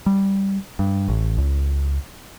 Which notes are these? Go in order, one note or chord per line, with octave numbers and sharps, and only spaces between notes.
G3
G2
A1
C#2